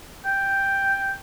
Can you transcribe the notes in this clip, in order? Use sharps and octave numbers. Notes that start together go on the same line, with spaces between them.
G5